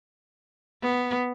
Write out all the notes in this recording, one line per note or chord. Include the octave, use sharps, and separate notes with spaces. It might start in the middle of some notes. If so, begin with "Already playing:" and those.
B3